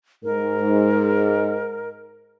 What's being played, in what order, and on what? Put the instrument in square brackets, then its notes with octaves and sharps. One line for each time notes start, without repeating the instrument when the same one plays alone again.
[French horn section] G#2 [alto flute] A#4